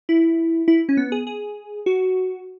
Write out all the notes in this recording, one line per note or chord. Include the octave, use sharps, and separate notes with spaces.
E4
E4
C#4
B3
G#4
G#4
F#4